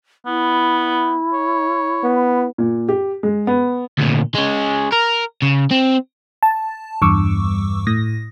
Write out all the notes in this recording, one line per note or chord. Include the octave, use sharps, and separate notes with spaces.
B3 E4
C#5
B3
A#2
G4
G#3
B3
D2 A#2
G#3 C#4
A#4
C#3
C4
A5
E2 G2 C#6 D6 E6
A2 D#6 A#6